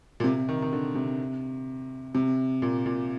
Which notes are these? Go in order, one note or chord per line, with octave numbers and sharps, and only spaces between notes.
A#2
C3
D#3
D#3
D3
C3
C3
A#2
A#2